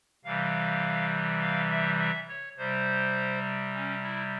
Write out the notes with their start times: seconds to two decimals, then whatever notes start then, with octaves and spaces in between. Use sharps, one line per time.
0.24 C3 E3 G3 F5
1.41 F5
1.70 E5
1.99 E5
2.29 C#5
2.57 C3 G3 C5
3.74 C#4
4.03 E4